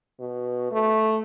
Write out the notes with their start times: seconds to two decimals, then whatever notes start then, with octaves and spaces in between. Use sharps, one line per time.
0.20 B2
0.71 A3